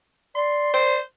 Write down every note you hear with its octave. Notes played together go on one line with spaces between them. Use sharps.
D5 C6
C5